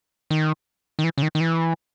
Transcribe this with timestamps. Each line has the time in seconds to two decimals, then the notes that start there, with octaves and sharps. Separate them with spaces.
0.30 D#3
0.99 D#3
1.04 E3
1.18 C#3
1.22 D#3
1.35 D#3
1.41 E3